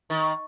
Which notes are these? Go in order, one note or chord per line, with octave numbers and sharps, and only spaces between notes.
D#3